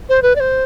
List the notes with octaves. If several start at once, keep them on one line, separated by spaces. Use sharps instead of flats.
C5
B4
D5
C5